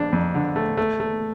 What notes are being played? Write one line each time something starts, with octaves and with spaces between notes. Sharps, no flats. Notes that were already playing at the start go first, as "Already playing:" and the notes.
Already playing: F2 D4
F2
D3
A3
A3
A3